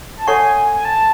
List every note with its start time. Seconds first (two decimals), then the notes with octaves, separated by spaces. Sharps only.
0.17 A5
0.27 A4 C#5 F#5 G#5 C#6
0.74 G#5
0.85 A5